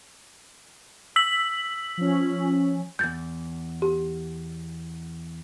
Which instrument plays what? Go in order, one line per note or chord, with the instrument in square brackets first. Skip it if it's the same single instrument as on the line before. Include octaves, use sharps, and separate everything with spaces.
[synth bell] E6 B6 F#7
[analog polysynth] F3 C#4
[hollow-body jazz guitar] E2 G2 [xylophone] G6 A6
[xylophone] G4